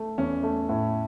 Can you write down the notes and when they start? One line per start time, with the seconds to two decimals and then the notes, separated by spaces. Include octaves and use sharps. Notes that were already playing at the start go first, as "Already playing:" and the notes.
Already playing: A3
0.18 E2 C#4
0.43 A3
0.69 A2